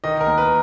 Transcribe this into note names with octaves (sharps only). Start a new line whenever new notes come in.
D#3 D#5
A#4
D#2
B4